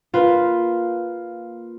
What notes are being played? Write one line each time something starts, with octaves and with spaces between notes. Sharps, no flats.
A#3 F4 B4